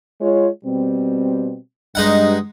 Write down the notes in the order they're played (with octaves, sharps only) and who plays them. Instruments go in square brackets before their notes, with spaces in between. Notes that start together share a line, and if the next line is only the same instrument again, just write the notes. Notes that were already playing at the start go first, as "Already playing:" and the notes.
[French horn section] G#3 F4 C#5
B2 G3 C4
[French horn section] G2 [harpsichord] G#3 D#4 F#5